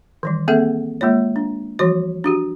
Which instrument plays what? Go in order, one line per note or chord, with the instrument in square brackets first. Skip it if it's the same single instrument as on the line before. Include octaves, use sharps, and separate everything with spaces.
[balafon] D#3 E3 G3
A#3 C4 G#4 A4 E5 F#5
G#3 A#3 F4 C#5
D4
E3 F3 G3 F#4 C#5
D4 F#4 G4